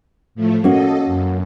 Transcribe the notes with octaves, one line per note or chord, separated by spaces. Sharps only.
A2 F3 A3
A#3 C#4 F#4 A4 D#5
F#2